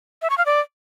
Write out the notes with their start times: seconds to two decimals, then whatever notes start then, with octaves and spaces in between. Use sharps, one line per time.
0.22 E5
0.30 C#6
0.38 F5
0.46 D5